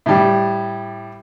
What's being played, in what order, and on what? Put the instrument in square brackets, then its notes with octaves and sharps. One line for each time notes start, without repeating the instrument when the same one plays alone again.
[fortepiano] A2 G3